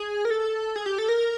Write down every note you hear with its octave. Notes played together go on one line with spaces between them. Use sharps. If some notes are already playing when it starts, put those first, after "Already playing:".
Already playing: G#4
A#4
A4
G#4
G4
A4
A#4